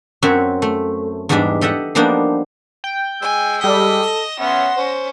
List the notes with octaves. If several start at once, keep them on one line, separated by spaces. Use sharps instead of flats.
F#2 C4 F#4 C#5 E5
A3
E2 G#2 G3 G#3 D4 E5
G4 A4 D#5 E5 F#5
F3 G3 A#3 B3 D4 D#4
G5
G#3 G#5 E6
G3 A4 D#5 B6
A#6 E7
B3 C#4 C#5 E5 F#5 C6
C#4 C5